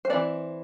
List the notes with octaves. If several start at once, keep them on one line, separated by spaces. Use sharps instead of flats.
C5
E3 A3 C4 D5